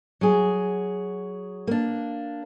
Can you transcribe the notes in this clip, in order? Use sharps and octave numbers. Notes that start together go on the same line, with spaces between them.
F#3 G#4
A#3 D4